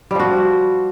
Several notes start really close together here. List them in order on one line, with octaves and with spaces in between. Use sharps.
G3 F3 F#4